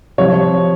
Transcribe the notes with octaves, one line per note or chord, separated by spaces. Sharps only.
C3 F3 C#5